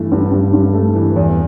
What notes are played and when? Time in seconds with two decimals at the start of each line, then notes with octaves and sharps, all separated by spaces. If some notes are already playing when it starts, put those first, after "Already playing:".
Already playing: G2 E3 A3
0.12 G2
0.32 G2
0.53 G2
0.74 A3
0.95 E3
1.16 E2